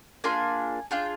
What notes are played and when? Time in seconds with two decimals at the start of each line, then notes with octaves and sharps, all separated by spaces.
0.24 A#3 D4 F4 G#4 G#5
0.91 D4 F4 G#4 G5